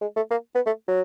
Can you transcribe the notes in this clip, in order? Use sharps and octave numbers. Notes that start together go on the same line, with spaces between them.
G#3
A3
A#3
B3
A3
F#3